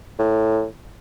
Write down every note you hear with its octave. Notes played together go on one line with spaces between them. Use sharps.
A2